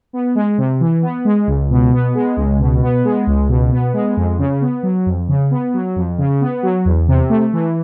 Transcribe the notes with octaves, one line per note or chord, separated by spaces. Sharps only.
B3
G#3
C3
E3
B3
G#3
C#2
B2
B3
G#3
C#2
B2
B3
G#3
C#2
B2
B3
G#3
F2
C#3
B3
F#3
F2
C#3
B3
F#3
F2
C#3
B3
F#3
E2
C3
A3
E3